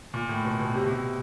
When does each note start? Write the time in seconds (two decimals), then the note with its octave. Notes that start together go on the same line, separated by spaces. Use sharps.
0.14 A#2
0.29 A2
0.45 B2
0.60 B2
0.74 C3
0.84 B2
0.90 C3